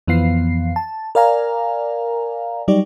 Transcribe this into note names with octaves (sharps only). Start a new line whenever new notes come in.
F2 E3 F3 B3 F5 C7
A5
A#4 D5 F5 G#5 A#5
F#3 G3 D#4 G4 D5